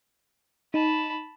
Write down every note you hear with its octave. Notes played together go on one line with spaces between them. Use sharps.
D#4 A5 B5